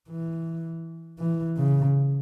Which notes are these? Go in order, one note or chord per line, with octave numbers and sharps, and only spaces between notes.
E3
E3
C#3